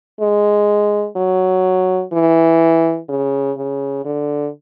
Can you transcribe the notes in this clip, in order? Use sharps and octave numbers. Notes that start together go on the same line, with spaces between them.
G#3
F#3
E3
C#3
C#3
D3